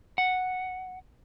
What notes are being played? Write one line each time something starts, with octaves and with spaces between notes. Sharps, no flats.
F#5